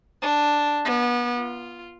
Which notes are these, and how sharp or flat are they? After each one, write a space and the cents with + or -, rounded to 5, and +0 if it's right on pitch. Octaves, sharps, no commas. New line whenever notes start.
D4 +0
B3 -30
F4 -5